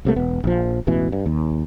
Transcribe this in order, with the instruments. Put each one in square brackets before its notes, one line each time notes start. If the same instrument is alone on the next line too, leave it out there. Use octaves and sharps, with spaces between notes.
[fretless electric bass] C2 C3 A3 A#3
E1 B3
A#1 F3
E1 A1 B2 E3
G2
D#2